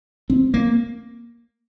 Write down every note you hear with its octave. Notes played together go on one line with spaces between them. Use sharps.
C4
A#3